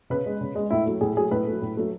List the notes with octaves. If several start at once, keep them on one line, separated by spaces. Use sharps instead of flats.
C#3 B4
G#3
C#3
G#3
A2 E4
F#3 A3
A2 G#4
F#3 A3 G#4
A2 B4
F#3 A3
A2
F#3 A3